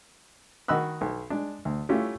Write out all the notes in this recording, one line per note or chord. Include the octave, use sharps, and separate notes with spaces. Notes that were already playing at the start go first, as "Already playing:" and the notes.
D#3 F#4 D#5 B5 E6 F#6
B1
G#3 D4
D2
A3 C#4 E4 F4 G4